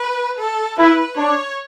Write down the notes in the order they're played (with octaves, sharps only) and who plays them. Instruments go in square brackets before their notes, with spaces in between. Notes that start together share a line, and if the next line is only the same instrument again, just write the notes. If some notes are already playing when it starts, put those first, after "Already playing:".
Already playing: [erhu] B4
A4
[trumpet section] E4 [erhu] B4
[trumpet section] D4 [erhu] C#5